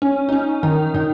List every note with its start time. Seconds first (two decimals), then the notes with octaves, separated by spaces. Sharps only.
0.02 C#4
0.29 D#4
0.33 C#4
0.63 D#3 D#4
0.94 D#3 D#4